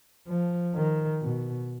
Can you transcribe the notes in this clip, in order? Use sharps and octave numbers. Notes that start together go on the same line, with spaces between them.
F3
D#3
B2